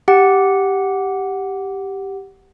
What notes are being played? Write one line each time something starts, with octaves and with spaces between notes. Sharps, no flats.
G4 F#5